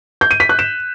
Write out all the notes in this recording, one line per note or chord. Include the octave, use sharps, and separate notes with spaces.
G6
D#7
B6
F#6
E7